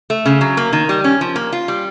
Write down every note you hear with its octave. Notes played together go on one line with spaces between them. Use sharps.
A3
C#3
F#3
A#3
D#3
G3
C#4
F3
A#3
F4
G3